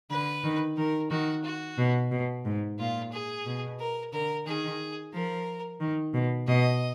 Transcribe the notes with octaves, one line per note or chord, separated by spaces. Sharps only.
D3 B4
D#3
D#3 A#4
D#3 F#4
F#4
B2
B2
G#2
A#2 F4
G#4
B2
A#4
D3 A#4
D#3 G#4
F3 A#4
D#3
B2
B2 D#5